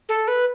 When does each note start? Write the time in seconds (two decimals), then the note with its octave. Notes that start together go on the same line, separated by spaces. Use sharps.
0.09 A4
0.28 B4